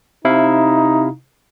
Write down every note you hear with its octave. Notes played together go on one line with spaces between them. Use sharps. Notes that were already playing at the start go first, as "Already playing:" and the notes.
C3 D#4 E4 F5